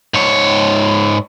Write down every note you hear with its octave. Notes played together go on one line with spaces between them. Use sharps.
G#2 C#5